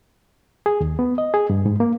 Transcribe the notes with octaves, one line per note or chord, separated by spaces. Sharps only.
G#4
D#2
B3
D#5
G#4
G2
G#2
A#3